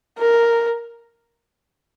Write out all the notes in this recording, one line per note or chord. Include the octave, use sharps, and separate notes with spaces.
A#4